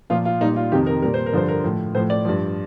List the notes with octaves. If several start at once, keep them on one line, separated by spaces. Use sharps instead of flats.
A#2 F3 F4
F4
A#2 G3 D#4
F4
F2 C3 D#3 G4
A#4
A#2 G3 A#4
C5
A#4
G2 D3 F3 C5
A#4
A2 F3
A2 F3 C5
D5
G2 F3